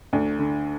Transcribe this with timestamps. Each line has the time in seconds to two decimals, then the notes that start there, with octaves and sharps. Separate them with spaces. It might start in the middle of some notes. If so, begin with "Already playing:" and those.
0.13 D2 D4
0.39 D3